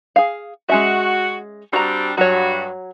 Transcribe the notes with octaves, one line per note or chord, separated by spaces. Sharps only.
G#4 F5
G#3 C#4 F#4 E5
G3 C4 D4 F#4 A#5
G2 F#3 F#4 C#5